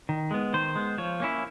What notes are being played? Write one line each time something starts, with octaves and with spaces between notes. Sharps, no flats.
D#3
G#3 B3
D#3 C5
G#3 B3
F3 C#5
A#3 C#4 E4